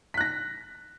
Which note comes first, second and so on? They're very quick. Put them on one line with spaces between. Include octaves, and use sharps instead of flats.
B6 F#6 A#6